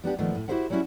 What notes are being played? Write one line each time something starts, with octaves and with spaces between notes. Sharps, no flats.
G3 B3 D4 G4
A#2 D#3 F3 A3 B3
A2
E4 F#4 G4 C5 E5 F#5
F#3 G3 C#4 E4 F#4 E5